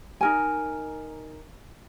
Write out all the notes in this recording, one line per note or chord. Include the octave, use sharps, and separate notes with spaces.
D#4 A#4 G#5